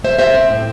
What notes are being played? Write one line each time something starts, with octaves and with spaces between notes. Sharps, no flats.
A3 C5 E5
C4 C5 E5
C4
A2